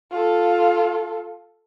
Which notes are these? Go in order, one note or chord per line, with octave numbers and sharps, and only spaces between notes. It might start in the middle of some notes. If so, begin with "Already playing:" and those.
F4 A4